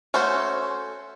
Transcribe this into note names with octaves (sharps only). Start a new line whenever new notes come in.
A3 C#4 F#4 A4 C5